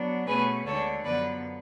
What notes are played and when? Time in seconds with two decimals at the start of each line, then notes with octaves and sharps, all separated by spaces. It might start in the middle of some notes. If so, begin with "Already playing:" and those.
Already playing: F#3 B3 D4
0.27 B2 A3 C#4 G#4 B4
0.65 D2 D3 G#3 D4 A4 C#5
1.04 F#2 D3 F3 B3 B4 D5